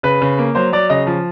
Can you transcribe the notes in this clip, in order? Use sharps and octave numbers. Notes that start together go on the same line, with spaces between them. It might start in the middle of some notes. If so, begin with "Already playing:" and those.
C#3 B4
C#3
A#3
F#3 C5
F#3 D5
C#3 D#5
F3